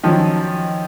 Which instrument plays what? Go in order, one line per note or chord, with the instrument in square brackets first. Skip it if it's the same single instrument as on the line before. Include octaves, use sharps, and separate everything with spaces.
[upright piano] D#3 F#3 C#4 [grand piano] F3